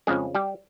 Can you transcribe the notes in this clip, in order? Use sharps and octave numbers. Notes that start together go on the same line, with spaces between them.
F2 C#3 F3 G#3 G#4
G3 G4